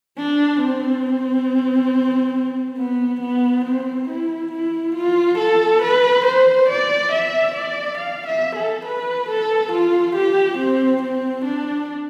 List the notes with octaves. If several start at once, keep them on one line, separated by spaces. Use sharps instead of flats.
D4
C4
B3
B3
C4
E4
E4
F4
A4
B4
C5
D5
E5
D5
F5
E5
A4
B4
A4
F4
G4
C4
C4
D4